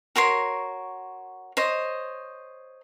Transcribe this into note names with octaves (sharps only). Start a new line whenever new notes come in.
F#4 A#4 C#5 C6
C5 C#5 D#5